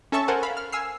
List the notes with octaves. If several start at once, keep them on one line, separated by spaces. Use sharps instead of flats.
C#4 A4 E5 A5 C#6
A4 A#4 C5 F#5 G#5 A5
F5 B5
F6
G#5 E6 F6 C7